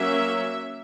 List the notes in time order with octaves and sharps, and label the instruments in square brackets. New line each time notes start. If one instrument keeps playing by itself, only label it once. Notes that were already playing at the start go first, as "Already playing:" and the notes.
Already playing: [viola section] F#3 A#3 C#4 E5